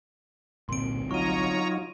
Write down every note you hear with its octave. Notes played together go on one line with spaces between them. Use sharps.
G1 C2 A#2 C4 C6 D7
F#3 D#4 F4 C#5 A#5 C#6 D#7